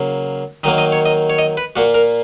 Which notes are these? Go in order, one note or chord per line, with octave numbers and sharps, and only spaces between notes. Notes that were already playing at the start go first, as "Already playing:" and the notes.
Already playing: C#3 F#3 A#3
D#3 F#3 A#3 D#5
D#5
C#5
D#5
C#5
D#5
B4
A#2 A#3 F#4
A#4